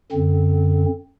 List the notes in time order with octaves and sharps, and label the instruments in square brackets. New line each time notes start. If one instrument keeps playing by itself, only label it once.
[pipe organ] F#2 D3 C4